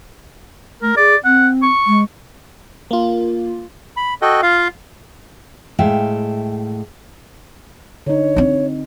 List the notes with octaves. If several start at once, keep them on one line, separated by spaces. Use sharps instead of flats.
A3 A#4
G#4 D5
C4 F#5
C#6
G#3
A#3 F4
B5
F#4 A4 D#5 G5
F4 F5
A2 G#3 E5 F5 G5
D3 D#4 C#5
C4 D4